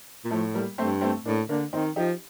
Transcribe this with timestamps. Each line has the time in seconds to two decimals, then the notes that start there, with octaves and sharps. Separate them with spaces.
0.24 A#2
0.31 A2 F3 A3
0.54 G3 A#3
0.78 G2 A3 C4
1.01 A3 C4
1.26 A2 A#3 D4
1.49 D3 A#3 D4
1.73 D#3 C4 D#4
1.96 F3 D#4 G4